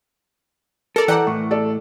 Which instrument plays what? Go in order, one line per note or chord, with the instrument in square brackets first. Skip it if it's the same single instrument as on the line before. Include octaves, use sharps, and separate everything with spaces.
[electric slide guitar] A4 [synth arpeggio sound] A#4 D5
[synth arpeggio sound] E3 F#5 G5 [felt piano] D5 A#5 D6
[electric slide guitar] A2 [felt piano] C#6
[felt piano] A4 D5